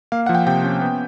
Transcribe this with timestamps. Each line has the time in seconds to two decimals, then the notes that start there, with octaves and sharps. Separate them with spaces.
0.12 A#3 F5
0.26 F3 F#5
0.35 G5
0.47 C3 G5
0.64 C#4
0.82 B3